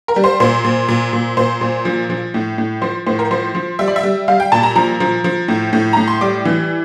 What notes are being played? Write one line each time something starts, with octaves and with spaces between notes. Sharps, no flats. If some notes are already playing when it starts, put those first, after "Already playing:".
A#4
G3
C5
A#2 C5
A#2
A#2
A#2
A#2 C5
A#2
F3
F3
A2
A2
F3 C5
A2 C5
A#4
F3 C5
F3
G3 E5
D5
E5
G3
G3 F5
G5
A#2 A5
A#5
F3 A#5
F3
F3
A2
A2
A2 A#5
C6
G3 D6
E3